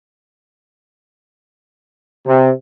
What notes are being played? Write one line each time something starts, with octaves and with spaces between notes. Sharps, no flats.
C3